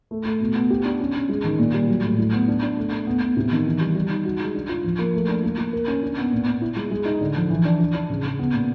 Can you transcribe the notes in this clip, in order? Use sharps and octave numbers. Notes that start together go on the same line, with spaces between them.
A3
A3
B2
B3
G4
D4
C#4
C#4
G#3
D#3
A#2
G3
F#3
A2
E4
B3
D4
D4
A3
A3
B3
B3
C3
D#3
E3
G3
G3
D#4
F#4
G#3
D4
F4
F3
A#3
A3
D4
A#3
A#3
A#4
C#4
D4
B3
A#2
A#2
E4
G#3
G#3
D#4
D3
F3
E3
D4
D4
D4
C#3
C#3
B3
A#2